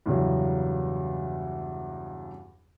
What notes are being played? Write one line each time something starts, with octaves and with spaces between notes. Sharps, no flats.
E2 G2 C#3 F#3